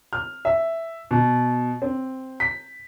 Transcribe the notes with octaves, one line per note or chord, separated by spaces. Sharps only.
F6
E5
B2
C4
B6